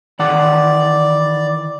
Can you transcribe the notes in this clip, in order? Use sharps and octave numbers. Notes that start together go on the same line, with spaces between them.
D#3 E3 D5 F#5